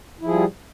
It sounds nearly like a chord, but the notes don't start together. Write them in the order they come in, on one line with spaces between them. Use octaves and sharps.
E4 F3 G#4 G3